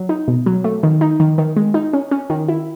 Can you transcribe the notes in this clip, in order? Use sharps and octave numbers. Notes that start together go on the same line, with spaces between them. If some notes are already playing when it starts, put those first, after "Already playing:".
Already playing: F#3
D#4
B2
F#3
A3
D#3
D#4
D#3
D#3
G#3
D#4
C#4
C#4
D#3
E4